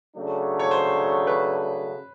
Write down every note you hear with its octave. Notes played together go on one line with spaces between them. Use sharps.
C#3 F#3 A3 D4
C#5
C5
B4